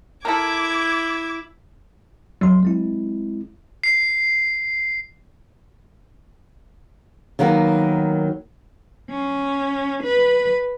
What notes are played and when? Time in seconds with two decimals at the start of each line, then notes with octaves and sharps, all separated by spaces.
0.25 E4 A4 A#4 D6 G#6
2.41 A1 F2 F#3 C6
2.63 G#3 C4 E4
3.84 C7
7.39 D#3 F#3 A#3 B3
9.10 C#4
10.03 B4